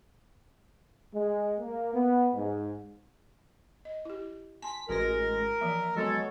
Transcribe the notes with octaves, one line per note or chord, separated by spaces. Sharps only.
G#3
A#3
B3
G#2
D#5
E4 G4
G#5 A5 C6 B6
A1 G#3 F#4 A#4 B4 A#6
E3 F3 A#3 E5
F#3 G#3 B3 A4 C#5